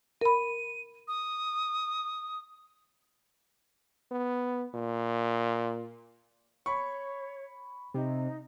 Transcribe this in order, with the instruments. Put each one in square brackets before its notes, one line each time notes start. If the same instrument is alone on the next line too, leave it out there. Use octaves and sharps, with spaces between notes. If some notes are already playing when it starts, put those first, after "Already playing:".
[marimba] A#4 B5 [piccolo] D#7
[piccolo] D#6
[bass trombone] B3
A#2
[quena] C#5 [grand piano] B5 C#6
[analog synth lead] C3 [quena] D#4